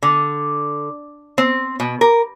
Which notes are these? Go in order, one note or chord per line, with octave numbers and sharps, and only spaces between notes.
D3
C4
B2
A#4